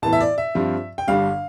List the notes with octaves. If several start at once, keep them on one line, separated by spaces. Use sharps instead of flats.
A2 E3 B3 A5
E5
D5
E5
G2 F3 C4 F4
G5
G1 G2 D3 G3 D4 F5